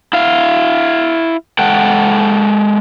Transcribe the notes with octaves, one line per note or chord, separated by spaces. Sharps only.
E4 F5
G#3 A4 F#5 G5